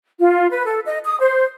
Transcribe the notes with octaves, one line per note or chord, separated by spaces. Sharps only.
F4
B4
A4
D#5
D#6
C5